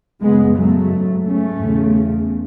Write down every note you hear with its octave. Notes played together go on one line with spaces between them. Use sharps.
F#2 C#3 G#3 B3
F#3 A3
G#2
A3 C#4
E2 C#3